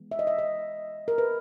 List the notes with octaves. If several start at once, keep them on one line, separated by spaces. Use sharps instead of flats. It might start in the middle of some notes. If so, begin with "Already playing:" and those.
Already playing: E3 G#3 B3
E5
D#5
E5
D#5
A#4
B4